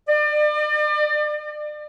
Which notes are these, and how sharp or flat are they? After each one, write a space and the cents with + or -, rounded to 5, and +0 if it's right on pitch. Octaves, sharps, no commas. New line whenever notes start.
D5 +35